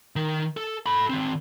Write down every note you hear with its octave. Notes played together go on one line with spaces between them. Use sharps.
D#3
A4
A4 B5
D#3 C4